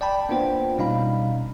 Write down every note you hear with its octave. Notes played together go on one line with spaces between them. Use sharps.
D5 G5 A5 B5
A#3 B3 D4 F4 C5 G5
B2 G3 C#4 D#4 F5 B5